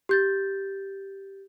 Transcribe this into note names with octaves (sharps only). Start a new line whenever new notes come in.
G4 G6 A6